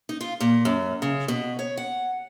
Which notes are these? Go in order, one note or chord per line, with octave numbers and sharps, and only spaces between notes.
D#4
F4
A#2
F#2
C#3
B2
C#5
F#5